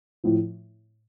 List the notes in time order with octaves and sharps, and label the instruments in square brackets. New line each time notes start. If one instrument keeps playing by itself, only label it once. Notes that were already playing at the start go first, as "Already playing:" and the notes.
[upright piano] A2 F3